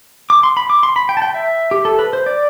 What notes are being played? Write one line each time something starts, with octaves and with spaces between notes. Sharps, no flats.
D6
C6
B5
D6
C6
B5
G5
A5
G5
E5
G4
A4
B4
C5
D5